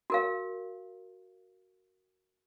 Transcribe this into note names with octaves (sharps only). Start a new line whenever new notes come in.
F#4 A#4 F5